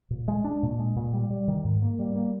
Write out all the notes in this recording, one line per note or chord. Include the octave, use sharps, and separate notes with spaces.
A#2
G#3
D4
A#2
G#3
A#2
G3
G3
D#3
G#2
A#3
G3
A#3